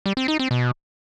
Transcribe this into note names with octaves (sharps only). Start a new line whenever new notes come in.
G3
C4
D#4
C4
B2